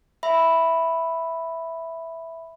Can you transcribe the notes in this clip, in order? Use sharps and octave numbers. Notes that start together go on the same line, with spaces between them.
E5 B5